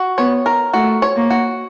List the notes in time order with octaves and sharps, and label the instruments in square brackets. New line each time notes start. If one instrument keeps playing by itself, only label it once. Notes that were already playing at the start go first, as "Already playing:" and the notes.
Already playing: [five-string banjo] F#4
[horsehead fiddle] B3 [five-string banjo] C#5
[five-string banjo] A#4
[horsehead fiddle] A3 [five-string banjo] F#4
[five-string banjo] C#5
[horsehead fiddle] A#3
[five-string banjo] F#4